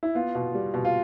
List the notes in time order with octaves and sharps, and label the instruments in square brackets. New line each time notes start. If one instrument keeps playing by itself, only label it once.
[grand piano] E4
[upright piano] B3 [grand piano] F4
[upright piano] B2
G3
B2
[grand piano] F4